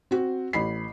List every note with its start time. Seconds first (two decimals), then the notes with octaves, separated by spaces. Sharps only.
0.11 C4 F#4
0.53 A1 B5 C7